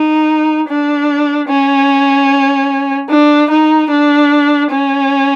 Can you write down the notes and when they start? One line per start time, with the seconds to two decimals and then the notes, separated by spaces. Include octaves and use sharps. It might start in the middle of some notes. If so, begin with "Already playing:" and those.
Already playing: D#4
0.68 D4
1.49 C#4
3.09 D4
3.50 D#4
3.90 D4
4.72 C#4